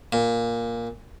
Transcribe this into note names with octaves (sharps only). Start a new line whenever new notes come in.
A#2